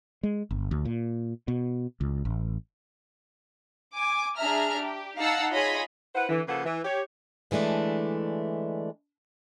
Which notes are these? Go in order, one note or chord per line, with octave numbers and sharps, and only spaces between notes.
G#3
G1
D2
A#2
B2
C#2
A1
G#5 D6
D4 G#4 E5 A#5 F6
G4
D#4 F5 F#5 A5 E6
F4 G#4 C#5 D#5 B5
E4 B4 C5 F#5
D3 E3
C#3 F3 A#3 A4 B4 F#5
E3
G4 C#5
D3 E3 G#3 A3 D4